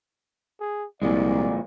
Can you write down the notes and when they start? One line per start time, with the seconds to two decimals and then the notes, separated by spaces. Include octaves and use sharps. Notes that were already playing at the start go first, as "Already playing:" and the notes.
0.60 G#4
1.02 C2 A#2 F3 G#3 D5